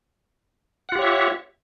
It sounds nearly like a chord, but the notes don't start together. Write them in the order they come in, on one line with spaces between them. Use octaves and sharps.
F#5 F4 G4 C#5 E5